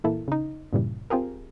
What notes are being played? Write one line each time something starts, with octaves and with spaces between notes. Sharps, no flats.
A#2 E3 A#3 E4 A4
C#3 D#4
G2 A#2 C#3 E3 G3
C4 F4 G4 G#4 A#4